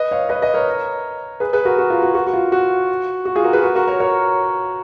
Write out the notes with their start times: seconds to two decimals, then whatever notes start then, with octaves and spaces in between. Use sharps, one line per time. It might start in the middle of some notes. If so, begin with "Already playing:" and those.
Already playing: B4 D#5
0.11 C#5 F5
0.29 B4 D#5
0.42 B4 D#5
0.54 A#4 C#5
1.40 G#4 B4
1.53 G#4 B4
1.65 F#4 A#4
1.78 F#4
1.90 F4
2.02 F#4
2.15 F#4
2.27 F#4
2.33 F4
2.52 F#4
3.25 F#4
3.35 F4 G#4
3.44 F#4 A#4
3.53 G#4 B4
3.63 F#4
3.75 F#4 A#4
3.87 A#4 C#5
4.00 A#4 C#5